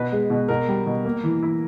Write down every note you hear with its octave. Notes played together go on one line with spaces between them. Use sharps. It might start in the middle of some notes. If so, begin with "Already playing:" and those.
Already playing: B2 B4
G#3
B2
B2 A#4
G3
B2
A#3
E3
E4